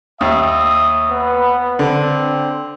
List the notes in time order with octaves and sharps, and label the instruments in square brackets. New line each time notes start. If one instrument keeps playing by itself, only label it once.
[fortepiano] D#2 [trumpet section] E5 D#6
[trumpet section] B3 B4
[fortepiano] D3 [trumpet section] C4